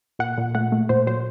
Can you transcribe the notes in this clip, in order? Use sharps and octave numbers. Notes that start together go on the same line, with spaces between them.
A#2 F#5
A#2
A3 F#5
A3
A#2 C5
F#3 C5